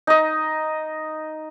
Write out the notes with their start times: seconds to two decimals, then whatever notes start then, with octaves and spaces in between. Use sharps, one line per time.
0.07 D#4 D#5